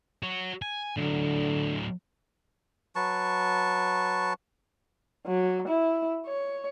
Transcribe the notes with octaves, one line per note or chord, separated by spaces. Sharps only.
F#4 C#5
G#5
A2 D3 F#3
F#3 B4 A5 C#6
F#3
E4
C#5